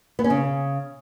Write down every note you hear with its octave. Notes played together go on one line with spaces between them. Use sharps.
B3
C#4
C#3